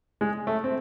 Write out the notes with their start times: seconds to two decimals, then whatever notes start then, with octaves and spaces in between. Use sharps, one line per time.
0.21 G#3
0.47 A3
0.64 C4